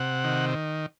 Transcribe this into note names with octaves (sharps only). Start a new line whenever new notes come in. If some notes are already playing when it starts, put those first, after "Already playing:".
Already playing: C3 F#5
D#3